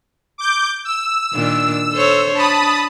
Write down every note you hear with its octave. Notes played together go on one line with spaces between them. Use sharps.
D6 G6
E6
A#2 D#3 D4
A4 C5 C#5
D4 A5 B5 D#6